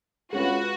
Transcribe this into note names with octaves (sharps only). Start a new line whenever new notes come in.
G#3 C#4 F4 F#4 B4